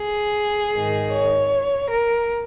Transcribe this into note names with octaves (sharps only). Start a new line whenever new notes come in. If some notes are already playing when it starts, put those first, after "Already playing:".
Already playing: G#4
G#2 D#3
C#5
A#4